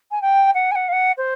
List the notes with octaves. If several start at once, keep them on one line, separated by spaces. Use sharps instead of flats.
G#5
G5
F#5
G#5
F#5
F5
F#5
C5